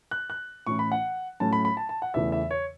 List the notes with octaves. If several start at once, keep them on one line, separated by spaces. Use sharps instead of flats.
F#6
F#6
A2 E3 C#4 E4 C#6
B5
F#5
A2 F#3 A3 C#4 E4 A5
B5
B5
A5
A5
F#5
E2 C#3 E3 A3 E5
E5
C#5